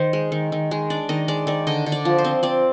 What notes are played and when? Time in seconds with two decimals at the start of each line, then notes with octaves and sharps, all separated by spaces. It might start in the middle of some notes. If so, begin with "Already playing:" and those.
Already playing: D#3 D#4 C5
0.13 G#3
0.32 D#3
0.52 D#3
0.71 G#3
0.90 D4 D5
1.09 D#3 D#5
1.28 G#3 D5
1.47 D#3 D5
1.67 D3 D#5
1.86 D3
1.92 D5
2.05 F3
2.18 C5
2.24 C4
2.43 C4 D5